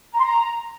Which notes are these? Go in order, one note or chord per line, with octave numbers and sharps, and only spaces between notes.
A#5
C6
A#5